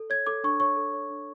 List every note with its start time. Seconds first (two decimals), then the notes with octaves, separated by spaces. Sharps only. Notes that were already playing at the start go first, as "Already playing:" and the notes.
Already playing: A4
0.10 C#5 G#6
0.27 A4 D6
0.44 D4 C#6
0.60 C#5 C#6
0.77 A4
0.93 C#5
1.10 D4